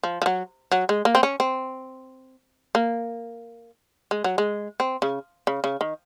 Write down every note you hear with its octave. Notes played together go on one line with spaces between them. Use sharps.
F3
F3
F#3
F#3
G#3
A#3
C4
C#4
C4
A#3
G#3
F#3
G#3
C4
C#3
C#3
C#3
D#3